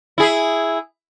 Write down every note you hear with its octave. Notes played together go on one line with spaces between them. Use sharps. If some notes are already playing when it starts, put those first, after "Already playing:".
E4 G#4